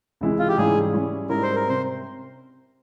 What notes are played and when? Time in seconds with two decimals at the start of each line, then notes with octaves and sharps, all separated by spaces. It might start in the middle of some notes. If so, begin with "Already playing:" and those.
0.21 C#2 C3 E3 G#3 E4
0.39 F4
0.48 G4
0.57 G#2 E3 G3 C#4 E4 G#4
0.94 C#3 G3 C#4 E4
1.29 G#2 G3 C#4 E4 A#4
1.43 C5
1.55 A#4
1.68 C3 C5